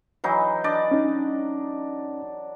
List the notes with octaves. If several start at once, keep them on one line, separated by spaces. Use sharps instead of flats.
E3 F#3 D#4
D4 D5 D#5
C#4 D#4